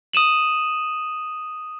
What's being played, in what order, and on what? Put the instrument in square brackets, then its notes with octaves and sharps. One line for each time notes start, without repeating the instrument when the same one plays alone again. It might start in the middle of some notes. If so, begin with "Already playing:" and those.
[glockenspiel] D#6 D#7 E7 F#7